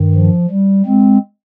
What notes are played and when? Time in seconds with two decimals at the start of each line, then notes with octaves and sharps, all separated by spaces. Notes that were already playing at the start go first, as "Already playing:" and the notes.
Already playing: G2 D#3
0.15 F3
0.50 G3
0.85 G#3 C4